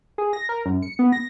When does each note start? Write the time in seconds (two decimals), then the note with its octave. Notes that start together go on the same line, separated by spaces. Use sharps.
0.18 G#4
0.33 A#6
0.49 A#4
0.66 F#2
0.82 C#7
0.99 B3
1.12 A#6